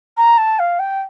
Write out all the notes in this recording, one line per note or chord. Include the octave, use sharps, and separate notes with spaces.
A#5
A5
F5
G5